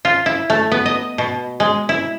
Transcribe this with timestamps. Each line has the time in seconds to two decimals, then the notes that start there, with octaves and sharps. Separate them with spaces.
0.05 F4
0.26 E4
0.50 A3
0.72 B3
0.86 D#5
1.18 B2
1.60 G#3
1.89 E4